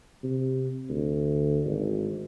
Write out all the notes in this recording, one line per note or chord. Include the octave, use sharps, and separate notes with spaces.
C3
D2
G#1